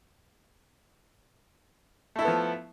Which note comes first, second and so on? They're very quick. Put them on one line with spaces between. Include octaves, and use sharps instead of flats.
A3 E4 A4 B3 F3